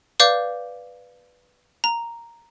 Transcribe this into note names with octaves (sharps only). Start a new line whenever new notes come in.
B4 D5 F5 D6 G6
A#5